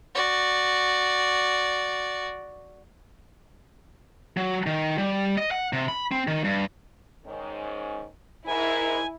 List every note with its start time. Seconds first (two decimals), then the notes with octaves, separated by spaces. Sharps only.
0.15 F#4 D5
4.37 F#3
4.66 D#3
4.98 G3
5.38 D#5
5.51 F#5
5.73 C3
5.88 B5
6.12 C4
6.27 D#3
6.44 G2
7.25 G#2 D#3 C#4
8.47 G#2 E4 A#4 G#5